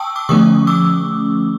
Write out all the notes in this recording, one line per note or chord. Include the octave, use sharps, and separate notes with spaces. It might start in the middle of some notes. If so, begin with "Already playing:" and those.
Already playing: G5 A5 C#6 D#6 E6
D6 E6
D3 F3 A3 C#4 C#6 D#6
D6 E6